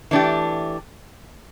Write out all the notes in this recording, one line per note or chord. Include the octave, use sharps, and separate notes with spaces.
E3 A3 D4 G4